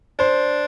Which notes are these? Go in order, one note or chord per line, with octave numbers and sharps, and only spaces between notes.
D4 C5